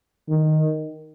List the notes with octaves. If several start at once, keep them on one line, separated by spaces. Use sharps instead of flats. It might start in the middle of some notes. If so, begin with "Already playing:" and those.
D#3